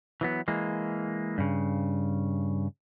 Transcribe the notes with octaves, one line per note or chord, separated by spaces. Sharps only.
E3 F#3 B3
E3 G#3 A#3
G2 C#3